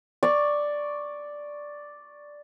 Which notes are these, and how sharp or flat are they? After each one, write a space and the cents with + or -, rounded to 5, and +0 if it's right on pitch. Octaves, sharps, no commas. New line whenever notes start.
D5 +0 C#6 +0